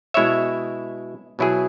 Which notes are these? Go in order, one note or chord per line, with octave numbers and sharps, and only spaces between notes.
B2 G#3 E4 C#5 E5
B2 F#3 E4 G#4